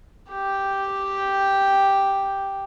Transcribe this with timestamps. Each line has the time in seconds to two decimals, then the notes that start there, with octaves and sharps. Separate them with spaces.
0.30 G4 G5